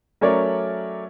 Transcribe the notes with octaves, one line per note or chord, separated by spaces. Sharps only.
F#3 A3 C#4 A#4 C#5 D5